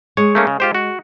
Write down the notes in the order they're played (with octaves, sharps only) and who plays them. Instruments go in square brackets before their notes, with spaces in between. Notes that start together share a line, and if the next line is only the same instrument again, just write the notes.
[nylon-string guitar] G#3 [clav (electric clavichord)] C#5
[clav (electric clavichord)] A3 A#3 C#4
C#3
F4 G4 C5
F#4